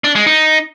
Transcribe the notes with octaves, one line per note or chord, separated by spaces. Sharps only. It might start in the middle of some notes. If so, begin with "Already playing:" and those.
D4
G#3
D#4